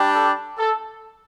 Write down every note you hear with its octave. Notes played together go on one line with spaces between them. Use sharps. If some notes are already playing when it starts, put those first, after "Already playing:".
Already playing: G3 D4 G4
A4
A4